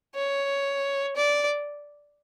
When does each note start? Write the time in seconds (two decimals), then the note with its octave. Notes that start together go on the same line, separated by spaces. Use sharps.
0.15 C#5
1.16 D5